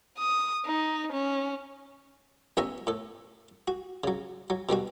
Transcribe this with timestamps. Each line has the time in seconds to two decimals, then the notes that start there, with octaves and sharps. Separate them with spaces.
0.18 D#6
0.65 D#4
1.12 C#4
2.57 A1 B3 C#5 E5 G#5 A#5
2.87 A2 A4
3.68 F#4
4.04 C#3 F#3
4.50 F#3
4.69 B2 D3 G3 F#4